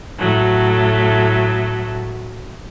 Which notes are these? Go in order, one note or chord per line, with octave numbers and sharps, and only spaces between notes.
A2 F#3 A3